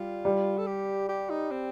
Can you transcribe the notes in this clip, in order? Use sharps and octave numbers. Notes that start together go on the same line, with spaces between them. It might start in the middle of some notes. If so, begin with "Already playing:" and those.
Already playing: G3 F4
G3
A4
G4
G4
D#4
C4